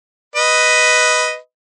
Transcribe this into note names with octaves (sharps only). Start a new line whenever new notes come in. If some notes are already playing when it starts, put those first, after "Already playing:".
B4 D#5